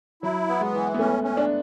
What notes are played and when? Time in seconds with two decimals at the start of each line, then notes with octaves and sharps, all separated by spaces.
0.22 F#3 E4
0.48 B3
0.61 G#3
0.73 E3
0.94 B3
0.99 A3 C#4
1.24 C#4
1.37 D4